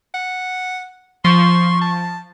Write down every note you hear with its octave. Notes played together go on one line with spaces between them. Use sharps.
F#5
F3 C6 C#6
A5